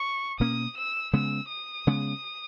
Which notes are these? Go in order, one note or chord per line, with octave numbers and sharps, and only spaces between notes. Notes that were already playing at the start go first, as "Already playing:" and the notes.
Already playing: C#6
B2 A#3 C#4 D#6
E6
C#3 G#3 B3 E6
D#6
C#3 G#3 B3